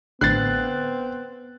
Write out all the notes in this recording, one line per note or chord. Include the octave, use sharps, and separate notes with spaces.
A1 D3 B3 C4 F#6 A6 C7